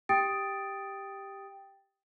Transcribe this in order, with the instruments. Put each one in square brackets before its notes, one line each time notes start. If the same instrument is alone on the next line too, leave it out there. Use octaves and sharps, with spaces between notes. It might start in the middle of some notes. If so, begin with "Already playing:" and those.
[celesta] G4 G5 D#6 A6 D7